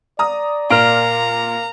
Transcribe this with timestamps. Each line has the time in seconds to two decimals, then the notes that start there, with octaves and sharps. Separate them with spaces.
0.19 D5 A#5 D#6
0.70 A#2 A#4 F5 A#5 F6 D7